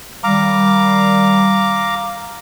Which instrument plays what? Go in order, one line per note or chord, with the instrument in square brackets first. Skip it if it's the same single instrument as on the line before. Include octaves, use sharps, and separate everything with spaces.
[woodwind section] D#3 G3 [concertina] F5 A#5 D6